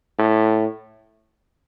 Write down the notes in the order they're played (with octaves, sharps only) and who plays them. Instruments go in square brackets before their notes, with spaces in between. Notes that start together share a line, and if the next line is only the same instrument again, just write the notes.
[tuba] A2